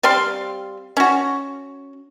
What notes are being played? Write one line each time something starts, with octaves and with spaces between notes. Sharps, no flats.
G3 C4 F5 C6
C#4 F#4